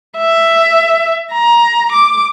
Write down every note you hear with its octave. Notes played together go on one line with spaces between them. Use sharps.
E5
A#5
D6